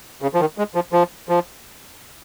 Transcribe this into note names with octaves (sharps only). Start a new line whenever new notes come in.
C#3
F3
D#3
G#3
F3
F3
F3